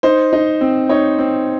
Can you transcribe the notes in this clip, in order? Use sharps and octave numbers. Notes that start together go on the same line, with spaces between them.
D#4 C5
D#4
C4
D#4 C#5
C4